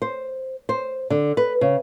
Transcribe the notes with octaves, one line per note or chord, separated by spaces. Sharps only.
C5
C5
D3
B4
C#3